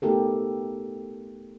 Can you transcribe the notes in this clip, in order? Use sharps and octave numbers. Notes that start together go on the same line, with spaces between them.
A3 B3 D#4 G4 A4 A#4